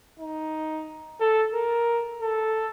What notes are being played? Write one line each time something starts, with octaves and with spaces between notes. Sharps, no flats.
D#4
A4
A#4
A4